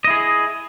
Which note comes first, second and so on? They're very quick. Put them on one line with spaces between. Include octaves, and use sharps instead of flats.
D#5 E4 G#4